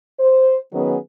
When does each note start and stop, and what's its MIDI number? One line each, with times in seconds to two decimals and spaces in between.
0.20 0.57 72
0.73 0.97 51
0.73 0.97 54
0.73 0.97 59
0.73 0.97 61
0.73 0.97 68
0.73 0.97 71